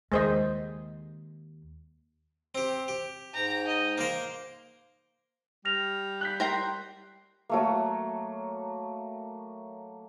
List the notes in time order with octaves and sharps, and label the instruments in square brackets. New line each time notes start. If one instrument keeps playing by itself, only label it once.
[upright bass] D#2 [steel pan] G#3 C5 D#5
[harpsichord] C4 G4
G4
[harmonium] G#2 G5 [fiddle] A#5
[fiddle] D#5
[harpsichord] A#3 A#4 [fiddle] C5
[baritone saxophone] G3 [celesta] F6 A#6 F7
[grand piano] F#6 G6 B6
[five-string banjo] A#4 G5 A#5 [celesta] C6 C7
[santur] F#3 A3 A#3